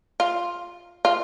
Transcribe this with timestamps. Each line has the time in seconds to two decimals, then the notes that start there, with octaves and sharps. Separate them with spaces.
0.20 F4
1.05 F4